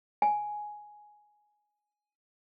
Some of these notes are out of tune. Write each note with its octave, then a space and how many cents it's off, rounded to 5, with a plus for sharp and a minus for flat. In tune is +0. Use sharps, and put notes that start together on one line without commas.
G#5 +10